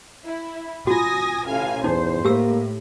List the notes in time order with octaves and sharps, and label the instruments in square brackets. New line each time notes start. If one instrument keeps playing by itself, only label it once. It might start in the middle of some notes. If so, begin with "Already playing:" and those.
[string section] E4
[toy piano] F4 F#4 [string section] G#5 D#6 A#6
[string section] A1 F5 G#5
[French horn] E2 [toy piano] D#4 [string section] C5
[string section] A2 [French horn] A#3 [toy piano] G4 E6